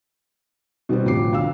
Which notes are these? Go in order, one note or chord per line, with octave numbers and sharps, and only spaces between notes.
B2 G3 B3 C4
A1 D3 F3 D6 C7
B1 D3 F5 E6